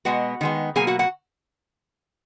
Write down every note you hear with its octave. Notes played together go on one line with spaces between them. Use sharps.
B2 G#3 B3 F#4 F#5
D#3 G#3 B3
B2 F#3 A#3 G#4 G#5
F#4 F#5
F#4 F#5